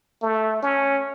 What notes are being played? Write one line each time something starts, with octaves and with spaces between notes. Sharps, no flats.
A3
C#4